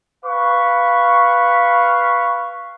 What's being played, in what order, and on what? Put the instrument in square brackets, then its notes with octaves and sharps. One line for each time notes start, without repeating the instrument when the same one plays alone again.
[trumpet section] B4 F5 C#6